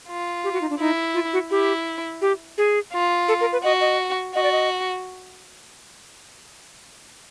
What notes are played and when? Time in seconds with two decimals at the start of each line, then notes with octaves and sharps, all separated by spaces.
0.08 F4
0.44 G4
0.53 F#4
0.61 D#4
0.70 D4
0.79 D#4 E4
1.14 F4
1.33 F#4
1.51 E4 G4
2.22 G4
2.58 G#4
2.93 F4
3.28 A4
3.41 A#4
3.53 B4
3.63 F#4 D#5
3.81 D#5
4.35 F#4 D#5
4.43 D5
4.52 D#5